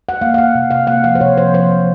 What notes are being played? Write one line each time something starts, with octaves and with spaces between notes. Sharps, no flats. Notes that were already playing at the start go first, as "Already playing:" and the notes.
F#5
A#3 F5
F5
A#3 F#5
C3
C3 F5
A#3 F#5
F3 F5
C5
C3 C#5
F3 C5
F3 C5
F3